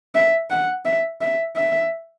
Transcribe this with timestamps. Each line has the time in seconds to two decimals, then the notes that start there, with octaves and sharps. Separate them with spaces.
0.15 E5
0.50 F#5
0.85 E5
1.21 E5
1.56 E5